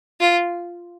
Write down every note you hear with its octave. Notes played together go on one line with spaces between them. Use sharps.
F4